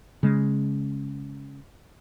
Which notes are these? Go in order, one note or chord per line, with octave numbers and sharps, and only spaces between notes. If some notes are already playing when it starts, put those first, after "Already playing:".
C#3 G#3